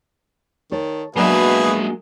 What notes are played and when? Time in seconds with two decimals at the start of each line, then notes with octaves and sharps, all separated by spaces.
0.71 D#3 A4 C#5
1.16 B2 F#3 G#3 A#3 D4 G#4 B4 E5